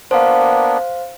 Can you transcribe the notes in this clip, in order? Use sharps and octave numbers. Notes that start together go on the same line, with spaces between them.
A#3 B3 D4 C5 F5